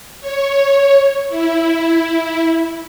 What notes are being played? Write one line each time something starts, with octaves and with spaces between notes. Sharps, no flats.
C#5
E4